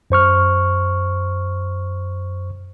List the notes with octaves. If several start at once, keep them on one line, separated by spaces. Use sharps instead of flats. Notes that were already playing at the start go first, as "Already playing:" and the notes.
F#2 C5 C#6 F6